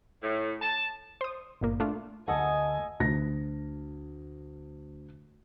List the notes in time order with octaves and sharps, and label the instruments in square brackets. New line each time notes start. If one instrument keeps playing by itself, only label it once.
[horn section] A2
A5
[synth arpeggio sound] C5 D#6
G1 A#2 A#3
A3 D4 F4
[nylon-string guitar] D2 F#5 [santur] A4 D#5 [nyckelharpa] G#5
[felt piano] D2 A#6